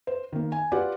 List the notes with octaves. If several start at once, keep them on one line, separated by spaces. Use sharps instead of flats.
C5
D#3 A#3
G#5
F4 G4 B4 D5 F#5